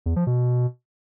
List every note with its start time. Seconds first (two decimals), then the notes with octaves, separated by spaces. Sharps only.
0.06 E2
0.16 F3
0.27 B2